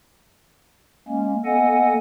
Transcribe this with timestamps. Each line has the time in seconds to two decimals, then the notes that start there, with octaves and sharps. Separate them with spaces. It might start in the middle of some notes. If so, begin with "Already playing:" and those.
1.08 G#3 A#3 C#4
1.45 A#3 B3 A4 D#5 F#5 G#5